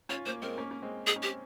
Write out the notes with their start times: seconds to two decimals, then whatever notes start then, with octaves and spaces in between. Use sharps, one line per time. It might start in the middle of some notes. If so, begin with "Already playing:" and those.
0.09 C#4 F4 C#5
0.26 A#3 C5
0.42 G#3 C4 A#4
0.58 A#3 C#4
0.71 C#4
0.82 G#3 C4
1.07 D#4 G#4
1.16 C#4
1.23 G4
1.25 C4